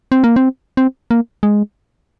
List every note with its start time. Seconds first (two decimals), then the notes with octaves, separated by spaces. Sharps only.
0.12 C4
0.24 A#3
0.36 C4
0.77 C4
1.11 A#3
1.43 G#3